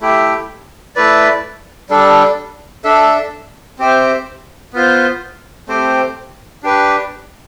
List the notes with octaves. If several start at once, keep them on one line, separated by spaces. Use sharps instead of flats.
A3 E4 G4
A3 E4 B4 D5
G3 D4 A4
D4 A4 E5
C4 G4 C5 E5
B3 F4 C5
A3 C4 G4 C5
D4 G4 B4